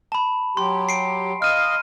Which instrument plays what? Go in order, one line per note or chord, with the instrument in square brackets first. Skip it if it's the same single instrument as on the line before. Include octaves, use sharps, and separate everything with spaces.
[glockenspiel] A5 B5
[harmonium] F#3 G4 [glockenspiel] C6
[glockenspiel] C7 D7
[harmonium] D#5 F5 [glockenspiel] F6 D#7